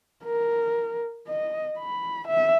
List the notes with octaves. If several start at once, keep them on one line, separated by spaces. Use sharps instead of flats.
A#4
D#5
B5
E5